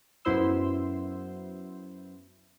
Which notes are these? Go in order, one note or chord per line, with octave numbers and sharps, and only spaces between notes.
F#2 B3 E4 C5 C6 E6